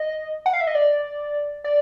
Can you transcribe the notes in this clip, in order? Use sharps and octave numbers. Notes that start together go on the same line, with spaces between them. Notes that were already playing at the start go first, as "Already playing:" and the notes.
Already playing: D#5
F#5
F5
E5
D#5
D5
D5